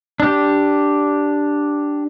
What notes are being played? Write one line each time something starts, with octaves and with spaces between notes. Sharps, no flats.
D4 G4